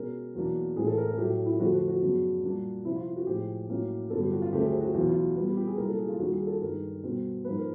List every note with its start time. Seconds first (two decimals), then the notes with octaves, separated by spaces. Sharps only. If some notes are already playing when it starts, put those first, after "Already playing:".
Already playing: B2 G#3 C#4 A#4
0.35 E2 B2 F#3 A#3 D4
0.76 A2 E3 G#3 C4 G#4
0.87 A4
0.98 A#4
1.08 A4
1.18 A2 F#3 A3 G4
1.46 E4
1.60 F2 D3 F3 A3 F#4
1.73 F#4
1.88 F#4
2.02 F#2 C#3 F#3 B3 D4
2.44 A#2 G3 A#3 D4
2.85 C3 F3 A#3 E4
2.96 F4
3.06 F4
3.16 F#4
3.27 A2 F3 G#3 G4
3.69 A2 F#3 A#3 C#4
4.10 G2 D3 F#3 B3 A4
4.21 G4
4.32 F#4
4.42 F4
4.52 D2 C#3 F#3 A3 C4 G4
4.66 G#4
4.80 F#4
4.94 E2 B2 F#3 B3 F4
5.09 F4
5.36 A#2 G3 B3
5.46 G4
5.57 G4
5.67 G#4
5.77 C2 A#2 F#3 A#3 A#4
5.89 A4
5.99 G#4
6.09 F4
6.19 D#2 D#3 G3 A#3 F#4
6.33 G#4
6.47 A4
6.61 G2 D#3 G#3 A#4
7.03 B2 G3 C4
7.45 G#2 F3 A#3 B4
7.59 A#4